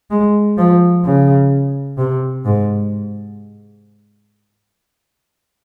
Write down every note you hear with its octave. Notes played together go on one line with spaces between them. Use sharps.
G#3
F3
C#3
C3
G#2